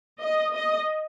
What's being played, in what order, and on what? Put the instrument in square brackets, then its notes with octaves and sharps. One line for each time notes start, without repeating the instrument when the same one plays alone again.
[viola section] D#5
D#5